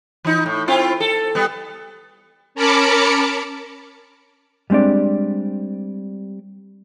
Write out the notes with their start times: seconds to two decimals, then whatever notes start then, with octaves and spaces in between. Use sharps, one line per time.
0.25 E3 D#4
0.46 A2
0.68 C4 E4 F4
1.00 A4
1.35 G3 B3
2.55 C#4 A#4 A5 B5 D6 C#7
4.70 G3 G#3 C4 D4 D5